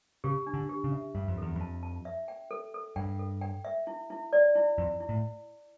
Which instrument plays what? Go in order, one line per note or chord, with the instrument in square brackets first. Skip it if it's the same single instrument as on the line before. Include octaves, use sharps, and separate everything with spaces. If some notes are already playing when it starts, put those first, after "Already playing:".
[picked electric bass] C#3 [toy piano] G4
[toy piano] D4
[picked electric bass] D3
[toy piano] G4
[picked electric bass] C#3
[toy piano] E5
[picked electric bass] G2 [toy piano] E5
[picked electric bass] F2
[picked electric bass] E2 [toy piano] A4
[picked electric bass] F2
[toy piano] A5
A5
E5
G5
A4
A4
[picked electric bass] G2 [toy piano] G5
[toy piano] A4
G5
E5
E4
E4
D5
E4
[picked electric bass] F2 [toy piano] E4
[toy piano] E4
[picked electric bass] A2